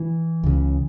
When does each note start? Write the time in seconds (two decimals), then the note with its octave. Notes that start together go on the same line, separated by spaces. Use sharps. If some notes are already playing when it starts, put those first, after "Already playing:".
Already playing: E3
0.43 C#2 C#3